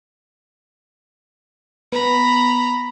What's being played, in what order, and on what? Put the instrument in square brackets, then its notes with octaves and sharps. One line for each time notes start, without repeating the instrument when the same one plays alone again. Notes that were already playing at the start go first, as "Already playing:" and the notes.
[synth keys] B3 [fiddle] A#5 B5